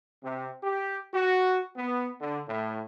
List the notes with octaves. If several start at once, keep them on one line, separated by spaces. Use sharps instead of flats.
C3
G4
F#4
B3
D3
A2